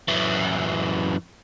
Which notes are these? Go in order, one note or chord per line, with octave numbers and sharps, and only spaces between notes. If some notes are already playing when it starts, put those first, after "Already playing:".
F#2 E3